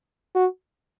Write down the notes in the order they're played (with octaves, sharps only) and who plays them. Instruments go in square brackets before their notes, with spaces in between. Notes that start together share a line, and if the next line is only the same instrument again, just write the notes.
[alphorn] F#4